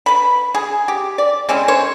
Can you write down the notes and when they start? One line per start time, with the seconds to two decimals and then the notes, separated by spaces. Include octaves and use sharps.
0.06 B4 B5
0.55 G#4
0.88 G4
1.18 D5
1.49 G#3 C4 C#4 E4
1.68 C5 C#5